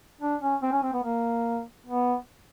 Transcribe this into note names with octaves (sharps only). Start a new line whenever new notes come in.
D4
C#4
C4
C#4
C4
B3
A#3
B3